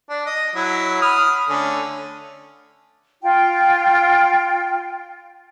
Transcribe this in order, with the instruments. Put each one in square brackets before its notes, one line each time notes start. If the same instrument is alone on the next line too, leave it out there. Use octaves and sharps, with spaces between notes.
[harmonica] D4
D#5
F#3 E4
B5 D#6 F6
D3 A3 C#4
[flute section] F4 G5